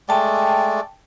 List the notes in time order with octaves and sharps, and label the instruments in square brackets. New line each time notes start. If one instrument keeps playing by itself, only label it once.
[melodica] G#3 A3 D5 [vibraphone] G5 A5